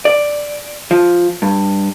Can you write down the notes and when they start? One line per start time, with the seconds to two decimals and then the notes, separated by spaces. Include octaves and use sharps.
0.05 D5
0.91 F3
1.42 G2